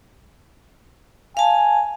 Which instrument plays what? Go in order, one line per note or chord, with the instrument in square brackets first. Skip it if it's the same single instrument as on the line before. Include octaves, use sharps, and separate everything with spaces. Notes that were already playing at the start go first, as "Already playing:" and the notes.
[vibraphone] F5 A5 [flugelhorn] G#5